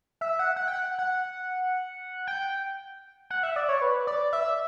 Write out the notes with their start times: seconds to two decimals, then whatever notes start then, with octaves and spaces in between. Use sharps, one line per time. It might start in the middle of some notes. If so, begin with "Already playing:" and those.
0.21 E5
0.39 F#5
0.56 F#5
0.68 G5
0.73 F#5
0.99 F#5
2.27 G5
3.30 F#5
3.43 E5
3.56 D5
3.69 C#5
3.82 B4
4.07 D5
4.33 E5